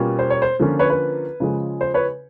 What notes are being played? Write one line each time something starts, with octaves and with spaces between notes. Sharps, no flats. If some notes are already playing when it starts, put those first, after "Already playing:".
Already playing: B2 G3 A#3 C#4 F4
C5
C#5
C5
D3 F3 A#3 C#4 F4
B4 C#5
B4
C#3 F3 G#3
C5
B4 C#5